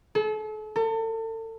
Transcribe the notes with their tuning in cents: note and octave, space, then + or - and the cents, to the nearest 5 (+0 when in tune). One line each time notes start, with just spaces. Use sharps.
A4 -40
A4 +35